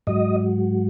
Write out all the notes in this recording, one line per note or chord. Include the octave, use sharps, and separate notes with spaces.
G#2 F#3 D#5